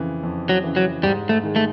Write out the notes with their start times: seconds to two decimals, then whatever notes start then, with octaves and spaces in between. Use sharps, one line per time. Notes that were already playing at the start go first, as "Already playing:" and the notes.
Already playing: F2 C#3 E3
0.23 F2
0.49 F#3
0.64 C#3 E3
0.76 F#3
1.03 G#2 G3
1.29 A3
1.43 D#3 G#3
1.56 A3